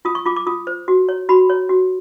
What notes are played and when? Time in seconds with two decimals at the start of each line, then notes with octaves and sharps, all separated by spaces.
0.05 F4 D#6
0.15 C#6
0.25 F4 D6
0.36 D6
0.46 F4 D#6
0.67 C5
0.88 F#4
1.09 C#5
1.29 F#4 B5
1.50 C#5
1.69 F#4